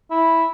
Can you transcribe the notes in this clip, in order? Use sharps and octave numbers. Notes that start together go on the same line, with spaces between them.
E4